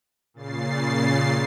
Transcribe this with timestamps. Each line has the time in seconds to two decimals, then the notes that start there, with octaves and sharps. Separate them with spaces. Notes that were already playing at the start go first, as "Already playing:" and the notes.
0.34 A#2 C#3 A6 C7